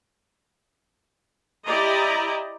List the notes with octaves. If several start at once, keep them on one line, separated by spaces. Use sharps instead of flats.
E4 G4 D5 D#5 A#5